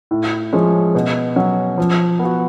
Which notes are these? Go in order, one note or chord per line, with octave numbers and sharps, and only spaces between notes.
A2
F3 G#3 C#4
B2
F#3 C#4
F3
B3
F#4